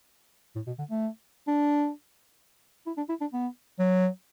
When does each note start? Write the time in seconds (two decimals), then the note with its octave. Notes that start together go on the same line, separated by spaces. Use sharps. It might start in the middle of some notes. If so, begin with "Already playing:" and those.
0.56 A2
0.67 B2
0.78 D3
0.90 A3
1.48 D4
2.87 E4
2.97 D4
3.09 E4
3.21 D4
3.33 B3
3.79 F#3